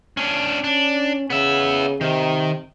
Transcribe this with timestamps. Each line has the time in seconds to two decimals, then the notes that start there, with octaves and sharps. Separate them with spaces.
0.17 C#4 D4
0.64 C#4 D4
1.30 C#3 B3 E5
2.01 C3 D#3